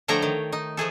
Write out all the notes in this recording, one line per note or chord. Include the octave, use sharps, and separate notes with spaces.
D3 F3 A3 C#5 G5 A#5
D#3
D#4
F3 A3 G#4 A4